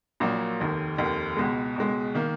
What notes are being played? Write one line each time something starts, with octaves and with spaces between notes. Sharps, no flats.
A#1 A#2 F#3 A#3
F1 D#2 D#3
F1 D#2 D#3
C#2 B2 G#3
C#2 B2 G#3
D#3 A#3